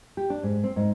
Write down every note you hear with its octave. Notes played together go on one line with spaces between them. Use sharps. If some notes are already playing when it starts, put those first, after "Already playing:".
G4
D4
G#2
C4
G#2